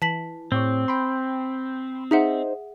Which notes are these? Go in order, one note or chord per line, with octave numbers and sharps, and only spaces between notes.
E3 A5 B6 F#7
A2 C4 G4 C#5
G5 B5 C6
D#4 G#4 C5 E5 F#5